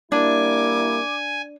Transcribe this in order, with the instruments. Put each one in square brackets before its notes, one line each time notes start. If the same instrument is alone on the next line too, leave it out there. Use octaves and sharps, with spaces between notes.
[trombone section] G3 A#3 E4 [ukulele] D4 [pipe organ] G#5 [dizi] D6